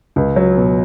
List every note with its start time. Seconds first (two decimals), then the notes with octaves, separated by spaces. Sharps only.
0.16 C#2
0.36 F#3
0.57 B2